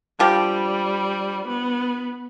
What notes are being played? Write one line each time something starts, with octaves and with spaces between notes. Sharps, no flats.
D3 F3 G3 G4
B3